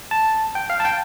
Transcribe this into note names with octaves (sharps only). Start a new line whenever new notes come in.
A5
G5
F5
A5
G5